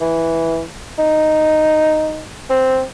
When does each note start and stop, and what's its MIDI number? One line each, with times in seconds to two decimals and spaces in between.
0.01 0.62 52
0.98 2.24 63
2.50 2.82 60